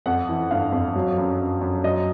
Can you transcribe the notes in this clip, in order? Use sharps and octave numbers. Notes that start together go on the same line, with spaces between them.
F2 F#5
E3
G1 F5
F2
F#3
F#2
F#2
F#2
F#3 D#5